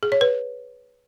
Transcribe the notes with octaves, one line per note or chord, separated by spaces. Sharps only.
G#4
C#5
B4